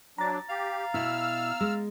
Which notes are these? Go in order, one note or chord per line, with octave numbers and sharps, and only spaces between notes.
F#3 D4 A#5 A6
G4 F5
B2 E4 E6 F6
G#3